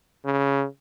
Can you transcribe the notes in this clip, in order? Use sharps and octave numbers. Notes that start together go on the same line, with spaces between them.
C#3